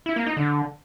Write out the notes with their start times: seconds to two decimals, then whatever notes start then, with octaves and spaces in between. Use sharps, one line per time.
0.06 E4
0.16 A#3
0.27 D#4
0.37 D3